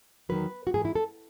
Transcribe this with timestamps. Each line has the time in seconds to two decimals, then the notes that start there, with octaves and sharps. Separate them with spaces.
0.29 E2 D#3 F#3 B4
0.67 F#4
0.74 G#2 E3 G#4
0.85 E4
0.95 A4